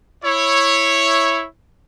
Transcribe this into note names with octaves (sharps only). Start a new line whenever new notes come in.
E4 C#5